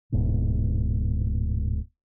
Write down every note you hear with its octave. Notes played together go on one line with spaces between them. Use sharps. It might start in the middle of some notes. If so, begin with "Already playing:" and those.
D1 G#2 B2